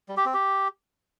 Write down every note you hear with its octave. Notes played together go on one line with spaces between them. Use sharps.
G3
G4
C4
G4